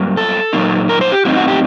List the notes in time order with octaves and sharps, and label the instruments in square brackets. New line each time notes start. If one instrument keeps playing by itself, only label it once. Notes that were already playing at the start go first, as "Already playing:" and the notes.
Already playing: [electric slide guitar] G2 F#3 A#3
A4
A#2 F#3 A#3 D#4
A#4
C5
G4
A2 F#3 C4 D#4 F#4
F#4
G4